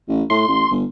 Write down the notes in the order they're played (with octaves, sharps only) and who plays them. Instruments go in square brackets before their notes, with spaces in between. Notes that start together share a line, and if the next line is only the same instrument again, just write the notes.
[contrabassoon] A1
[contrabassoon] A2 [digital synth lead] C6
[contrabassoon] A1
G1